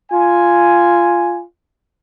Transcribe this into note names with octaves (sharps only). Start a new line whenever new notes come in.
F4 G#5